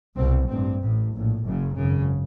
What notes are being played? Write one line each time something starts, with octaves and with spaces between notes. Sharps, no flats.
C2 B2 C4
A1 G2 C4
A1 A2
A#1 A2
F#1 F#2 C#3
G#1 F#2 C#3